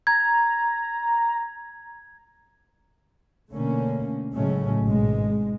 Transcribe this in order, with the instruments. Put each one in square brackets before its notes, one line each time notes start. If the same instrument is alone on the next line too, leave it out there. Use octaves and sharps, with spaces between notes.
[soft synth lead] A#5 [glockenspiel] G#6
[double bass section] B2 D3 A3 A#3 C#4
A2 C#3 F#3 G#3 A3 C#4
G#1 B2 G#3